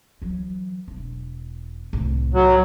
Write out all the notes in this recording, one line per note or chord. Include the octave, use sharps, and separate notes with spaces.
E3 F#3
E1
C2 A2
F#3